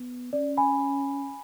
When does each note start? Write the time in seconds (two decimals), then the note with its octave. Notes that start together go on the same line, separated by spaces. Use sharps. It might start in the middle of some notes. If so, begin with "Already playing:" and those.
Already playing: B3
0.33 C#4 D5
0.57 G#5 B5